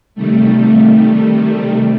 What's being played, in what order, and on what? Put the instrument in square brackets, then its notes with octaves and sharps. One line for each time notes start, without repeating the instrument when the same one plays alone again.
[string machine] C3 D#3 G3 A3